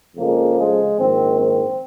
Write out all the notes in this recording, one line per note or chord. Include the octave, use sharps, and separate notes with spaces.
F2 C#3 F3 G#3 A#3
G#3
A#1 G#2 D#3 C4
C4